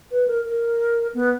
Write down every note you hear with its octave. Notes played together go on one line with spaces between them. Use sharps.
B4
A#4
A#4
B3